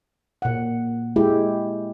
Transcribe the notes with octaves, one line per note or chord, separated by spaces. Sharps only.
A#2 F#5
G#3 E4 G4